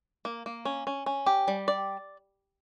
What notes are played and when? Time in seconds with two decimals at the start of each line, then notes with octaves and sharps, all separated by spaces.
0.25 A#3
0.46 A#3
0.65 C#4
0.87 C#4
1.06 C#4
1.26 G4
1.48 G3
1.68 D5